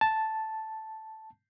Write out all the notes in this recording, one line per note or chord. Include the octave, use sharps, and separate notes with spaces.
A5